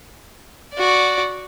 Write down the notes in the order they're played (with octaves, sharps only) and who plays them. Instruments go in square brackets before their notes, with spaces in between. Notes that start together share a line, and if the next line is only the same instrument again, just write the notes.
[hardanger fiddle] F#4 D5